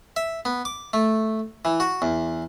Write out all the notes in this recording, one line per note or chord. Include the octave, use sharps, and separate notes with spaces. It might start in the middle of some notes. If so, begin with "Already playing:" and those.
E5
B3
D6
A3
E3
F#4
E2